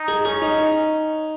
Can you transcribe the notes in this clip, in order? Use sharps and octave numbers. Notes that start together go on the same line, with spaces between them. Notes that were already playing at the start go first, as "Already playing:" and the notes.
Already playing: D#4
G#4
C#4 G#4
D#4